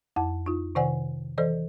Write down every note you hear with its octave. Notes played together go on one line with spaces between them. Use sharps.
F2 E4 F#5 A5
D#4 F4
C3 D#3 C5 D5 F#5 G#5
E3 A4 C5 D5 D#5